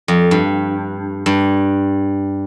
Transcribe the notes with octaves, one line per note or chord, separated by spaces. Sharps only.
F2
G2
G2